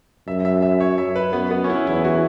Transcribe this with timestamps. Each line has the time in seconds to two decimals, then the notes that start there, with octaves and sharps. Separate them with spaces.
0.28 F#2 E5
0.45 E5
0.62 E5
0.80 C#5
0.98 E5
1.16 B4
1.33 F#2 B3
1.51 B3
1.64 C#4
1.70 E4
1.87 E2 E4
2.05 F#4